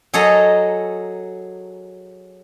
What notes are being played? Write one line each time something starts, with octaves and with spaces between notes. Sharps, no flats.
F#3 G#4 A4 D#5 A#5